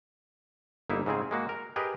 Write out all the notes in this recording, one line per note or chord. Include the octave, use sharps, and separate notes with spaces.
G1 A#3 D#4 E4 E5
G#2 C#3 C4 G#4
G#3 A#3 F#4
A#4
G4 G#4 A#4 B4 D#5